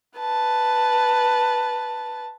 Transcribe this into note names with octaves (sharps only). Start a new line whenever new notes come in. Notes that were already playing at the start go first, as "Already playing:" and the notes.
B4 A5